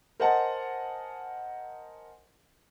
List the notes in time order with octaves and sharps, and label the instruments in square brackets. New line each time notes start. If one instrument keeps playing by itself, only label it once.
[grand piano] A#4 C5 D#5 F#5 G#5 A5